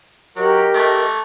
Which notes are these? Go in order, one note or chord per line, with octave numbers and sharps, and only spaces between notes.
F#3 G4 A#4 D#5
A3